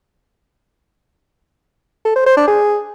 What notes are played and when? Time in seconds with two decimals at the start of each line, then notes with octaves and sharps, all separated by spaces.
2.05 A4
2.16 C5
2.26 C5
2.37 D4
2.48 G#4